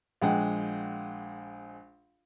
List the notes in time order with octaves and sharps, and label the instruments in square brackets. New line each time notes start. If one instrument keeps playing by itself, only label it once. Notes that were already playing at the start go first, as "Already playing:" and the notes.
[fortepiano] A#1 G#3 F#5 G5